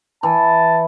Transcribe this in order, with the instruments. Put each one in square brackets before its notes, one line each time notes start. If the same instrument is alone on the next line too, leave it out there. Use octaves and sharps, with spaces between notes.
[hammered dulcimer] E3 [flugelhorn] A5